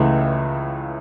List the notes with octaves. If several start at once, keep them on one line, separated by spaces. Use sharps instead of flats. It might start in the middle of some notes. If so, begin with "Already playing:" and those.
Already playing: C#2 C#3 E3 A3